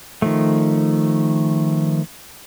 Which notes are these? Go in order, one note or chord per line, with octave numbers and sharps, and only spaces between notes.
D#3 F3 A3